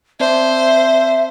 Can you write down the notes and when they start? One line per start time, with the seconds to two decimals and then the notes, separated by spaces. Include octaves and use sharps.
0.20 C4 C5 D5 E5 A5